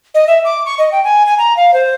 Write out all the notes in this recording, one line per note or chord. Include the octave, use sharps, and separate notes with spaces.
D#5
E5
D6
C#6
D#5
G5
G#5
G#5
A#5
F5
C5